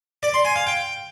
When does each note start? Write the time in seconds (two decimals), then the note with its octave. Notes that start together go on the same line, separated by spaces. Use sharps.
0.23 D5
0.34 C6
0.45 G#5
0.56 F5
0.67 G5